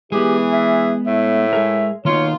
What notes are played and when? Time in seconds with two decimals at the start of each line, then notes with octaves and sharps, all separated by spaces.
0.12 E3 G#3 B3 G4 G#4
0.52 E5
1.06 A2 E5
1.53 G#3 G#4 A#4
2.05 B2 D#3 A#3 D#4 F4 C#5